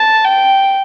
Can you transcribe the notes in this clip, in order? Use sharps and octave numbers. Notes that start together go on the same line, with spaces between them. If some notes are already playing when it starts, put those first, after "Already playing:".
Already playing: A5
G5